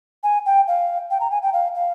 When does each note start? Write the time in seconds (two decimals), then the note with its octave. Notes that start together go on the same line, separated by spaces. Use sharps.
0.23 G#5
0.46 G5
0.68 F5
1.11 G5
1.20 A#5
1.31 G#5
1.43 G5
1.53 F5
1.75 F5